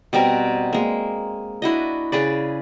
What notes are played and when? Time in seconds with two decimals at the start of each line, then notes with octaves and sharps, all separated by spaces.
0.13 B2 G3 C4 A#4
0.73 G#3 A#3
1.62 D4 E4 F#4 D#5
2.12 C#3 G#4 B4 D5